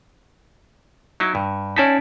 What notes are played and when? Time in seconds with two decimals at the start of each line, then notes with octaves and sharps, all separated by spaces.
1.20 F#3 D#4 E4
1.35 G2
1.76 C#4 D#4 E4 D5 A5 B6